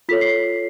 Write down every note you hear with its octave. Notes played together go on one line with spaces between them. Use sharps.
F4 A4 C#5 B6
C7